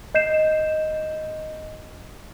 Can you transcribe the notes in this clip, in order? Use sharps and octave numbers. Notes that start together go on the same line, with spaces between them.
D#5 G6 C7 E7